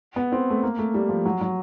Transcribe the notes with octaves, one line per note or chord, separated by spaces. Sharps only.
B3
C4
A3
A#3
A3
G3
F3
F#3
F#3